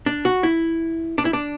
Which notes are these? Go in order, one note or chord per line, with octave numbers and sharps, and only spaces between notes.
D4
F#4
E4
D4
E4
D4